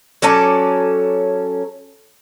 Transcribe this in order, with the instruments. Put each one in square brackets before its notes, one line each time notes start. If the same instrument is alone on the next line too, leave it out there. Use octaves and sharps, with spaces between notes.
[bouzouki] F#3 C#4 A4 D5